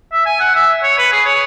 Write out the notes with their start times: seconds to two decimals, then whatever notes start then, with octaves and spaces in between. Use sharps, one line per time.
0.12 E5
0.26 G#5
0.40 F#5
0.55 E5
0.83 C#5
0.98 B4
1.12 G#4
1.26 C#5